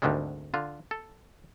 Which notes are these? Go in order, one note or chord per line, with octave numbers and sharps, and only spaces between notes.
G#1 D2 D3 D#3 G3 G#3
D3 F4
A4